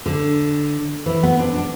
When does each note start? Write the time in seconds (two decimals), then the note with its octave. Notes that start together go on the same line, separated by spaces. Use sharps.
0.06 D3
1.06 E3
1.23 B3
1.39 D4
1.56 D4